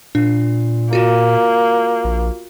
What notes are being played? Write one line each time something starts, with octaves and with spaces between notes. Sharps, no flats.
A#2 D4
A#3 F4 F#4
A#1